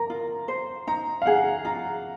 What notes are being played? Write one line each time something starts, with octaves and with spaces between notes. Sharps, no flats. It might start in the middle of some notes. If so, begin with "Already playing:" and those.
Already playing: A#4 A#5
F4
C5
D#4 A#5
F5
G#4 F#5
F4 A#5